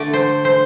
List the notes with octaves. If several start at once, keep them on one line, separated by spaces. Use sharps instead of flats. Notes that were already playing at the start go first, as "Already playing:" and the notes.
Already playing: D3 A3 D5
C5
C5